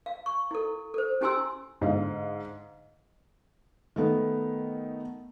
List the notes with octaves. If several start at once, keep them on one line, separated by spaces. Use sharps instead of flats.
F5
C#6
E4 A4
A4 C5
C#4 E4 G4 G#5 C6 E6
G#2 D3 D#5 F5
D#3 A3 B3